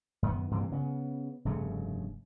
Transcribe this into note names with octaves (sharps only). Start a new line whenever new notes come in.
F#2 D#3 B3
G2 C3 E3 A#3
C#3 B3
F1 G2 C#3 A3